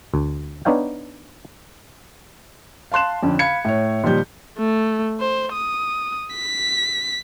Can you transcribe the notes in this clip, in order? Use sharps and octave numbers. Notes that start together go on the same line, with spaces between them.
D2
B3 D4 D#4 C#5 F5 G5
F5 A5 C6 F#6 E7
F2 D3 C#4
F5 B5 G#6 C#7
A2 C#5
A#2 D#3 F3 G3 G6
A3
C5
D#6
B6